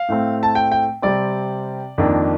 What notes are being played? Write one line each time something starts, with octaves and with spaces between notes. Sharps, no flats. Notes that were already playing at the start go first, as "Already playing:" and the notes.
Already playing: F5
A2 A3 C4
A5
G5
G5
C3 G3 C4 D5
F2 D#3 A#3 D4